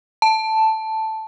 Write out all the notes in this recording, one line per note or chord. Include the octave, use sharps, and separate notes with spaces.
A5